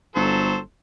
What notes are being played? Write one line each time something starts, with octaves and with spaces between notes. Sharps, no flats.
G1 F#3 A4 C5